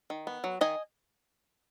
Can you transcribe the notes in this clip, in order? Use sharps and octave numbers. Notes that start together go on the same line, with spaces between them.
D#3
B3
F#3
D#3 D#5 G#5